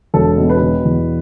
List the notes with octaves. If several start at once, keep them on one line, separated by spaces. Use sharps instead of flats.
E1 A4
B2
B4
B2
E2